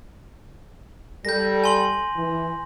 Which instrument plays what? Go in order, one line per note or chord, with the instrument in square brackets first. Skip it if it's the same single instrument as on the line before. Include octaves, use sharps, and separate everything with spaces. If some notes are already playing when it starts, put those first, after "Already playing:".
[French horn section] G3 A4 [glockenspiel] G6 A#6
[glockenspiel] G#5 C6 F#7
[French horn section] E3